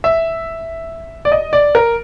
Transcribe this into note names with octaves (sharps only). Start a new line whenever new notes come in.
E5
D5
D#5
D5
A#4